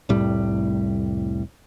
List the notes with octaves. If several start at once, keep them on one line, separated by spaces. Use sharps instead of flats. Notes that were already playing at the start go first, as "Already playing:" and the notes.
F1 C2 A2 G3